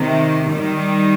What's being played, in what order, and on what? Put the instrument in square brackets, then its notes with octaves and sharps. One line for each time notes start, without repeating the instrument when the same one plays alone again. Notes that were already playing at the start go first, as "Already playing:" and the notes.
Already playing: [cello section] C3 D#3
D#3 G3